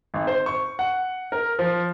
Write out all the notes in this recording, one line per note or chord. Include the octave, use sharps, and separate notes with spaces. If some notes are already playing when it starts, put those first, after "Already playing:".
G#1
C5
C#6
F#5
A#4
F3